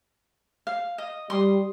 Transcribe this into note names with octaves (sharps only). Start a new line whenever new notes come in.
F5
D#5
G3 C6 D#6